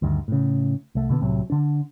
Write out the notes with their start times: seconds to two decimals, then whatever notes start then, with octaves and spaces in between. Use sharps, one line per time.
0.02 D2 G2 D#3
0.28 A2 C#3
0.95 C2 A3
1.09 B2 D3 F3 B3
1.21 C2 A2 C3 F#3
1.50 D3 D4